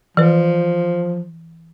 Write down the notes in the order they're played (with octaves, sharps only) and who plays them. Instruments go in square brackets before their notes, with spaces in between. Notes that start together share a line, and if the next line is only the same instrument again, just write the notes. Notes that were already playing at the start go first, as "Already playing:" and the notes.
[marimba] E3 B4 [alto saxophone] F3